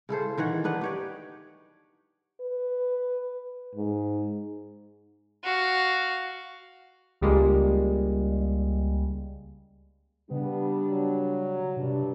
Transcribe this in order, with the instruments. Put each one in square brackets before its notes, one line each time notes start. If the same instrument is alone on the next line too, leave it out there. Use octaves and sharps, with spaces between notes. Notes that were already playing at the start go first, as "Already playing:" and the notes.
[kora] C#3 E4 A4 C5
D#3 E3 C#5 F#5
D4 D#4 B4 F#5
G4 C#5 G5
[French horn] B4
G#2
[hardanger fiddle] F#4 F5
[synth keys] C#2 G3 G#3 A#3
[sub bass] C#3 [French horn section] G3 D4 [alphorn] B3
[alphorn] F#3
[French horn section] G2 D4 [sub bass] C3